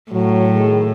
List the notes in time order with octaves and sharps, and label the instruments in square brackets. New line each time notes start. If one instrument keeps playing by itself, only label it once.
[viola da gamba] A2 [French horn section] F#3
[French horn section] D#3 G#4